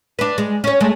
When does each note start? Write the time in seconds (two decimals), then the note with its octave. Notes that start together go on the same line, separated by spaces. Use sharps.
0.19 D4 B4
0.38 G#3
0.64 C#4 C#5
0.80 G#3 A3